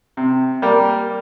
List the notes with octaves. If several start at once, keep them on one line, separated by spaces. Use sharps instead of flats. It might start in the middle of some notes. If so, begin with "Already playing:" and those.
C3
G3 A#3